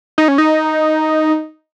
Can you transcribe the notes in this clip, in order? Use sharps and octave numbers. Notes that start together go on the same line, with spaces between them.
D#4
C#4
D#4